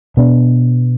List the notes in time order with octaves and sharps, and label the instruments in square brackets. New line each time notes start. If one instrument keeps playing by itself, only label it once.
[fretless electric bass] B2 B3 D4